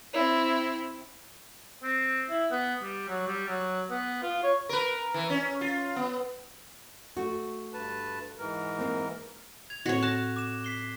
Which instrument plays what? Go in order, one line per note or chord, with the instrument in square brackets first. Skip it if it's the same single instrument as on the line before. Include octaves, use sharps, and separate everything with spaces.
[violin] C4 E4
[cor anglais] C4
E4
B3
G3
F#3
G3
F#3
B3
F4
C#5
[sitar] A#4 B4
E3
C#4
F4
B3
[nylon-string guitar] A3 F#4
[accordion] G2 B4 A5
G#2 E3 A#4
[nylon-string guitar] A#3 C4
[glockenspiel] G#6 F7
[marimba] A2 C4 [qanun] F#4 C#5
[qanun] A5 [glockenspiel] F#6 A#6
[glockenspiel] D6 E7
B6 C7 G7